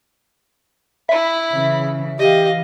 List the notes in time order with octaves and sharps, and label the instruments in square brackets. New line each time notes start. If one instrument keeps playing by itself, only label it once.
[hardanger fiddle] E4 B5 [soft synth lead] E5
[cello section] C#3 E3
[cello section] E3 [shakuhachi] G4 [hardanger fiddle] D#5 F5